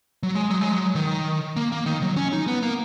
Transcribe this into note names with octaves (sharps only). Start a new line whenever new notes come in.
F#3
G#3
F#3
G#3
F#3
D#3
A#3
A#3
D#3
F#3
C#4
D#4
B3
A#3